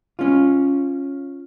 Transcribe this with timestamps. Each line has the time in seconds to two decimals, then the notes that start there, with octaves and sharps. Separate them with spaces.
0.19 C#4 F4